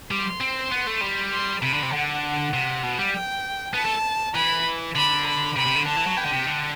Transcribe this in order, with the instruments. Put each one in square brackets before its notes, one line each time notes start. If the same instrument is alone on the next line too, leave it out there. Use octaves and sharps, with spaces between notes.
[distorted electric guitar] G3 [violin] C6
[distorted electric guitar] C4
B3
A3
G3
[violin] C6
[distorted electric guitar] C3 [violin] B5
[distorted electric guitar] D3
C3
[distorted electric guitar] D3 [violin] F#5
[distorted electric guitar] C3
B2
G3
[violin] G5
[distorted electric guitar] B3 [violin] A5
[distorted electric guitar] A3
[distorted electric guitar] E3 [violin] B5
[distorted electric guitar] D3 [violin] B5
[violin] B5
[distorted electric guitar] C3 [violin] B5
[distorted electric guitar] C3
D3
[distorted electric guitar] D3 [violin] A5
[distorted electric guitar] E3
F#3
[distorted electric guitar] E3 [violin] G5
[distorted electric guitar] D3
C3
D3